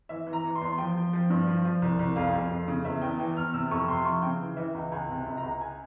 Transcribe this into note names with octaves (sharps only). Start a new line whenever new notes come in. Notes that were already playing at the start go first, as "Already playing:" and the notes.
E3 E5
E3
A#5
E3
C6
E2
F3 G5
F3
F3
G2
F3
F3
C2
C2
F2 F5
F2
F2
C#3
E2 E5
E2 G5
E3 G5
E2 F6
C3 E6
F2 C#6
C3 C6
F3 C#6
C#3 G5
E3
E3 E5
C#2
C#2 G#5
C3
C#2
A#5
C#2
G#5